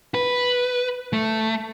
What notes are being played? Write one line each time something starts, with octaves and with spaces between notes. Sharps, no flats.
B4
A3